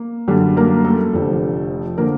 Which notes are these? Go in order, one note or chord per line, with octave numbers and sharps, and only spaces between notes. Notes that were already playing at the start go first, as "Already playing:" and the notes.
Already playing: A#3
F#2 D3 G3
A#3 A#4
A3 A4
F1 F2 D3 F3
D3 F3 A#3 A#4